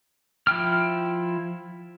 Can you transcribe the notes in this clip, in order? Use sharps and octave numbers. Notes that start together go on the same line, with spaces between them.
F3 E4 G5 F6